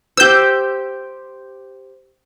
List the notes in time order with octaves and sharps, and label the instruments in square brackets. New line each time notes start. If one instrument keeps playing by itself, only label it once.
[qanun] G4 C5 [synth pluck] E6 G6